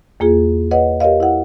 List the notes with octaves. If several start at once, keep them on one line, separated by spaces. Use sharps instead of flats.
E2 A#3 F4 G#4
B4 C#5 D#5 F#5
G4 A#4 C#5 D#5 F5
E4 F#5